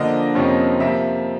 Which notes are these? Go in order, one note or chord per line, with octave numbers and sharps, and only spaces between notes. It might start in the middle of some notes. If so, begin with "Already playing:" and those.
Already playing: D3 F3 A#3 D4 D#5
F2 C3 F3 A#3 C#4
C3 F3 A#3 E5